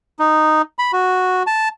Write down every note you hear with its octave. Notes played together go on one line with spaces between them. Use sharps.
D#4
B5
F#4
A5